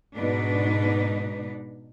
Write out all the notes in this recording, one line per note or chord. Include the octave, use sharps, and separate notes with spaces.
G#2 B2 D4 D#4 B4